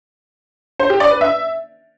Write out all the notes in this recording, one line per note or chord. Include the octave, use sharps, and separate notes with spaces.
C5
G4
D5
B4
E5